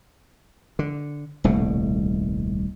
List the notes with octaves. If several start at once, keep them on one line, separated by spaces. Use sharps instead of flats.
D3
D#1 C2 B2 A3